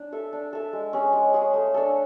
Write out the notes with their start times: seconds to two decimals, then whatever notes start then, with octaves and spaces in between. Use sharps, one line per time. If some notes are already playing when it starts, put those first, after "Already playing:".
Already playing: D4
0.12 A4 E5
0.33 D4
0.53 A4 E5
0.73 G#3
0.93 C#4 G#4
1.13 G#3
1.34 C#4 G#4
1.53 A3
1.74 D4 A4